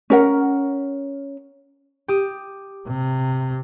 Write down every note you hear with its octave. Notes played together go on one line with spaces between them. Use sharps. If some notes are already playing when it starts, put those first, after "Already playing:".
C#4 A#4 F#5
G4 D#6
C3